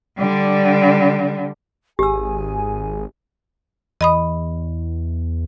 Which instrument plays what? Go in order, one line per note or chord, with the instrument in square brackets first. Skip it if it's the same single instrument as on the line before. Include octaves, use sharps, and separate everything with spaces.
[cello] D3 G3
[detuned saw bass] G#1 [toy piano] G4 E6 [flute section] G#4 G#5
[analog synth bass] E2 [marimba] D#5 B5 D#6